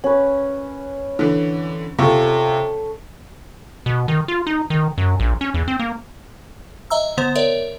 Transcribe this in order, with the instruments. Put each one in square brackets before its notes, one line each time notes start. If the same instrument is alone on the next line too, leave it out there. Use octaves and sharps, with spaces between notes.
[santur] C#4 B4
[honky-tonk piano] D3 E3
[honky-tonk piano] C3 F4 [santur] A4 C#6
[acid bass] B2
D#3
F4
D#4
D#3
F#2
A#1
C#4
E2
C4
A#3
[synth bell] D#5 E5 A#5 E6
D3 B3 C5
A#4 C#5 D5 E5